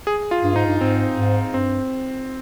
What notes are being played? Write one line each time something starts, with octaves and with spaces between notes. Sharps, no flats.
G#4
F4
G2
G#2 D#4
G2
G#2 C4
G#2
G2 C4